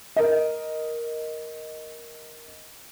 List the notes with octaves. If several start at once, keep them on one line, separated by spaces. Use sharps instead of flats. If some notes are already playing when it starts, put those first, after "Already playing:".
A#4 D#5